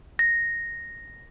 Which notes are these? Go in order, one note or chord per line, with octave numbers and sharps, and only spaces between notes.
A#6